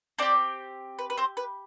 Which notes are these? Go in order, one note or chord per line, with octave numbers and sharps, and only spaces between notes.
C4 D4 G4 D5
B4
B4
C4 C5
B4